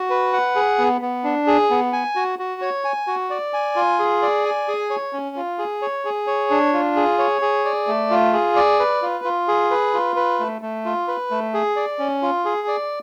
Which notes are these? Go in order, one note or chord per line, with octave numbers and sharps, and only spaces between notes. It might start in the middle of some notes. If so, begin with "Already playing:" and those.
Already playing: F#4
B4
F#5
G#4
B3
B3
D4
G#4
B3
G#5
F#4
F#4
C#5
G#5
F#4
D5
G#5
F4
G#4
D5
G#5
G#4
C#5
C#4
F4
G#4
C#5
G#4
C#5
D4
F4
G#4
C#5
G#4
D5
A3
F4
G#4
D5
B4
F4
F4
G#4
B4
F4
B4
A3
A3
F4
B4
A3
G#4
D5
C#4
F4
G#4
D5